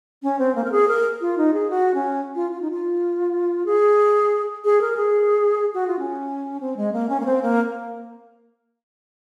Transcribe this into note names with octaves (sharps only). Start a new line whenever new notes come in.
C#4
C4
A#3
A#4
G#4
A#4
F4
D#4
G#4
F#4
C#4
F4
F4
D#4
F4
G#4
G#4
A#4
G#4
F#4
F4
C#4
C4
G#3
A#3
C#4
A#3
C4
A#3